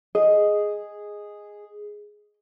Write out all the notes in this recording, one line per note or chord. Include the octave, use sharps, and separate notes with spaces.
G#4 D#5